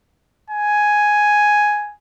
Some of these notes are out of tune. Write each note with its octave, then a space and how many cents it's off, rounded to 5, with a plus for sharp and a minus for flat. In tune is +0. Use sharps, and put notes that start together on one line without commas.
G#5 +5